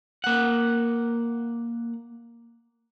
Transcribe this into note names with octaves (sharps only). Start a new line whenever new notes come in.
A#3 F#5